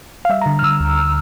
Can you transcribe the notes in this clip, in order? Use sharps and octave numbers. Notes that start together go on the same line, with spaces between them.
F5
G3 E5
A#5
D3
F6
D3 E6
D2